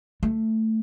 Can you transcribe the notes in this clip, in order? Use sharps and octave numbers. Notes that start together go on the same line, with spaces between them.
A3